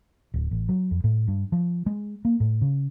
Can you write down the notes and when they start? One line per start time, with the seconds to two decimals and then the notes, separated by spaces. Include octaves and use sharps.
0.34 D1
0.51 A1
0.69 F#3
0.91 F2
1.04 A2
1.28 G2
1.52 F3
1.86 G#3
2.25 A#3
2.40 A2
2.62 C#3